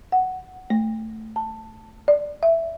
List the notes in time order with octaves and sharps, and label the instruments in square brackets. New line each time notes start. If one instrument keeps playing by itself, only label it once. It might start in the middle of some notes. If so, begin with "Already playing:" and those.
[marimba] F#5
A3
A5
D5
E5